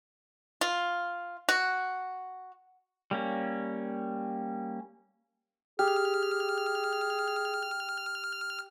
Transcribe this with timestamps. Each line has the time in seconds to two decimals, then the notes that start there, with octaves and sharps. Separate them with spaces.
0.61 F4
1.49 F#4
3.11 G3 A#3 C#4
5.79 G4 G#4 F6